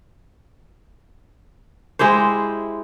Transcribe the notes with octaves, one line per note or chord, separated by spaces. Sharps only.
G#3 E4 G4 C5